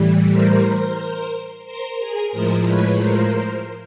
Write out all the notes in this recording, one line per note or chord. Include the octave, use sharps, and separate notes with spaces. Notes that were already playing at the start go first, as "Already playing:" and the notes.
Already playing: A2 E3 G3
A#4 C5
A#4 C5
G#4 A#4
A2 F3 G#3 A#4 C5
B4 C#5
A#4 C5